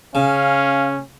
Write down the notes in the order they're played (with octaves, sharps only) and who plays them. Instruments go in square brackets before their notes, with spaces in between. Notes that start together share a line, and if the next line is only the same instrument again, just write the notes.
[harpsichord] C#3 [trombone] C#4 [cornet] F5